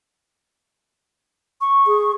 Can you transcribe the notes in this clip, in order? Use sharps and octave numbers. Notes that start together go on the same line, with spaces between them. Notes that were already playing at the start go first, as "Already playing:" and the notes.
C#6
G#4